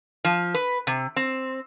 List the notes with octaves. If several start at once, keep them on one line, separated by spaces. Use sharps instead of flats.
F3
B4
C3
C4